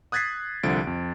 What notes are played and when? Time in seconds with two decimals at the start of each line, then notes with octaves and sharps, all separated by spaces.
0.12 D#6 F#6 G#6 A6 B6 C7
0.63 C2 D3 F3 A6 D7
0.87 F2